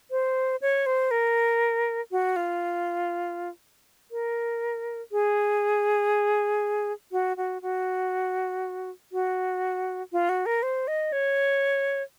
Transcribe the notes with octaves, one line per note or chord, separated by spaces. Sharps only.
C5
C#5
C5
A#4
F#4
F4
A#4
G#4
F#4
F#4
F#4
F#4
F4
F#4
A#4
C5
D#5
C#5